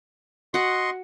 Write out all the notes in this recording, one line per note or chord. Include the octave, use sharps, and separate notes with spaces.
F#4 D#5 F#5 C6 C#6